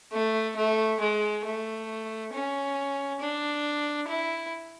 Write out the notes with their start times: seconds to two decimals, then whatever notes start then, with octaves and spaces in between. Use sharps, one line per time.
0.12 A3
0.56 A3
1.00 G#3
1.45 A3
2.33 C#4
3.21 D4
4.09 E4